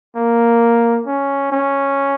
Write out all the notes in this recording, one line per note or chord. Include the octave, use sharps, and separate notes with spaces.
A#3
C#4
C#4